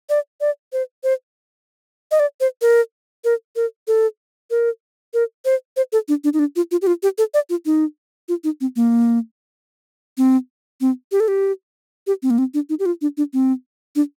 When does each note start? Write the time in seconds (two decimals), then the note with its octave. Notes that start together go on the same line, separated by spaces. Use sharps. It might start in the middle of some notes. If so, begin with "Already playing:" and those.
0.09 D5
0.41 D5
0.73 C5
1.04 C5
2.11 D#5
2.20 D5
2.41 C5
2.62 A#4
3.24 A#4
3.56 A#4
3.88 A4
4.51 A#4
5.14 A#4
5.45 C5
5.77 C5
5.92 A4
6.08 D4
6.24 D4
6.33 D#4
6.39 D4
6.56 F4
6.71 F4
6.82 G4
6.87 F4
7.03 G4
7.18 A4
7.34 D5
7.50 F4
7.66 D#4
8.29 F4
8.44 D#4
8.61 C4
8.76 A#3
10.18 C4
10.81 C4
11.12 G4
11.20 A4
11.28 G4
12.07 G4
12.23 C4
12.30 A#3
12.38 C4
12.54 D4
12.70 D#4
12.79 G4
12.86 F4
13.02 D4
13.17 D4
13.33 C4
13.96 D4